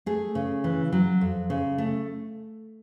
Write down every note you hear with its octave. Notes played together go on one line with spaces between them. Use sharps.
A3 G#4
C#3
E3
F#3
F2
C#3
A3